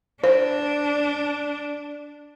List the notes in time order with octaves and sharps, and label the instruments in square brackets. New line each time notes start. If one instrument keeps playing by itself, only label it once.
[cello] D4 [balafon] C5